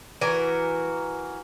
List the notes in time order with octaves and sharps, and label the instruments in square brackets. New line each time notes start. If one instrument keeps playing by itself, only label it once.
[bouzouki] E3 F#4 A#4